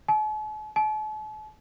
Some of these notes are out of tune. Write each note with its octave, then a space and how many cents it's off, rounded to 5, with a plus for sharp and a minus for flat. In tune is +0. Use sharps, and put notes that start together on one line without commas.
A5 -45
A5 -40